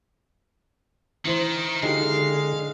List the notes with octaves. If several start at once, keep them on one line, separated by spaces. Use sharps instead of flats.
D#3 E3 E4 C5
D3 G#3 D#4 E4 G4 F5